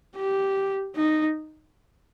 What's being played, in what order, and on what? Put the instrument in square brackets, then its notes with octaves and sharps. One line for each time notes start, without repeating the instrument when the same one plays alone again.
[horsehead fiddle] G4
D#4